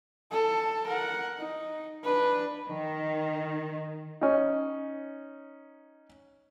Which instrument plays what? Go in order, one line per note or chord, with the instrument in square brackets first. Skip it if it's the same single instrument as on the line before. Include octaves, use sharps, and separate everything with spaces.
[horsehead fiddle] A4 A5
A#4 F#5
D#4
D4 B4
[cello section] D#3
[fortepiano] C#4 D#4